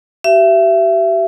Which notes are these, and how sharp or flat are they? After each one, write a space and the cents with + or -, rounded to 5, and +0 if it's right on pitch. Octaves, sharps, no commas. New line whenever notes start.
G4 -35 E5 +25